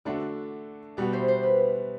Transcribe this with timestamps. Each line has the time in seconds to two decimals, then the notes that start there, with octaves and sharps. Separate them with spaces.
0.05 D3 A3 D4 F#4 D5 F#5
0.97 B2 G3 B3 F#4 D5 F#5
1.13 C5 E5
1.28 C5
1.43 B4